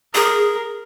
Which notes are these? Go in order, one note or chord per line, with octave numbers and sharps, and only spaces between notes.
G#4 A#4